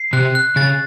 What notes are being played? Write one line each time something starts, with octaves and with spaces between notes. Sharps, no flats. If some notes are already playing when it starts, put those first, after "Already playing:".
Already playing: C7
C3 F#6
F#6
C#3 A6